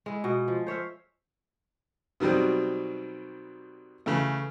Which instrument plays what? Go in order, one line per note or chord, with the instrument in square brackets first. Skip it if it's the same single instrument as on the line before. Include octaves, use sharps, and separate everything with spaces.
[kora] G#3 E4
B2 D#5
F3
C5 C#5 E5 F5
[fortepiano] B2 D#3 F#3 G3 C4
C#3 E3 A3